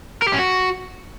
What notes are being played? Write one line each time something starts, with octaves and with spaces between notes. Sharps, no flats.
A#4
G4
C#4
F#4